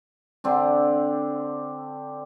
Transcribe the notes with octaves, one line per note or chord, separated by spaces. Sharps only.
D3 C4 D4